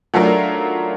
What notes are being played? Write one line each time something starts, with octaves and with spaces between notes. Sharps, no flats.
F#3 A3 D4 F4 A#4